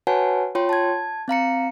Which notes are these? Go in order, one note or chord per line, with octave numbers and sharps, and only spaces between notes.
F#4 B4 C#5 F#5 G#5 A5
F4 C#5 G5 C6
A5 G#6
C4 F5 A#5 C#7